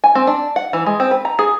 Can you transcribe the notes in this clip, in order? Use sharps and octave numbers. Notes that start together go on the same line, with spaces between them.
G#5
C4
D4
F#5
E3
G#3
C4
B4
A#5
G#4